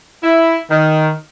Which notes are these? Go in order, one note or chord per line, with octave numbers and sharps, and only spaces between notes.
E4
D#3